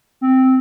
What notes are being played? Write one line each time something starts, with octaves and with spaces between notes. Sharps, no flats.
C4